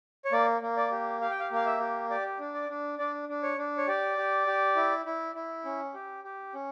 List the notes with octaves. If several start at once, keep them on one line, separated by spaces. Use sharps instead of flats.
C#5
A#3 D5
A#3
D5
G4
G4 F5
G5
F5
A#3 F5
E5
G4
G4 D5
D4
D5
D4
D4 D5
D4
C#5
D4
C#5
G4 D5
G4
G4
E4
E4
E4
C#4
G4
G4
C#4